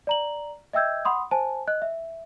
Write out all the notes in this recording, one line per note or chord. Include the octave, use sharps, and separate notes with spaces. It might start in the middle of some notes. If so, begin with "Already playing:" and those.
D5 A#5 F#7
D#5 E5 G5 E6 G6 G#6
F#5 B5 C6 D#6
C5 G#5 A5
D#5 F#6
E5